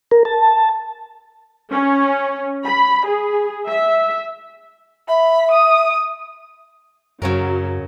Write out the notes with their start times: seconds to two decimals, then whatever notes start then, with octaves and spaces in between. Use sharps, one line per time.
0.11 A#4
0.25 A5
1.72 C#4
2.65 B5
3.07 G#4
3.68 E5
5.08 E5 B5
5.52 D#6
7.22 F#2 C#3 F#3 C#4 A#4